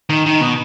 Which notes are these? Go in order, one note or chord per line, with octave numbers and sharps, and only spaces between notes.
D#3
D#3
B2